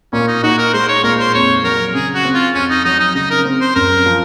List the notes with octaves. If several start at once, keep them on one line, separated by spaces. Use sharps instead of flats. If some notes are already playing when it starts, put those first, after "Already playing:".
A#2 C#4
D#4
D#4 F#4
A#4
G#3 C5
C#5
A#2 A#4
C5
F2 C#5
F#3 A#4
C#3 G#4
F#4
C4
F4
F2 C#4
D#4
F#3 D#4
D#4
C#3 D#4
A#4
C4
C5
F#2 A#4
F3